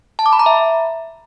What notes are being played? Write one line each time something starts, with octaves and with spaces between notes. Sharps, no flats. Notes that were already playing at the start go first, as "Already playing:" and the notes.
A5
D6
B5
A#5
E5